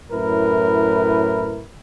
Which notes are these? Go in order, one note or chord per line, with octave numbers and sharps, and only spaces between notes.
F#2 A2 E4 A#4 B4